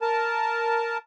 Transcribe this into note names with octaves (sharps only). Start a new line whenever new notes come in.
A#4 A5